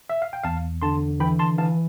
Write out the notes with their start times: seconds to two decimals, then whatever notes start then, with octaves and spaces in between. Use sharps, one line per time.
0.10 E5
0.22 F5
0.33 G5
0.43 E2 F5 A5
0.82 D3 A5 C6
1.20 E3 G5 B5
1.39 A5 C6
1.58 E3 F5 A5